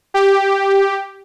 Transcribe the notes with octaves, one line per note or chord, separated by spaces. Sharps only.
G4